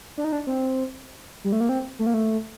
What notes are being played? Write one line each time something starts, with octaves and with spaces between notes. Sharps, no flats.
D4
D#4
D4
C4
G3
A3
A#3
C4
A3
A#3
A3